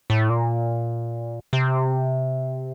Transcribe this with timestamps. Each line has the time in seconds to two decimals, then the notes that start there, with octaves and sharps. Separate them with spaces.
0.10 A2
0.30 A#2
1.53 C3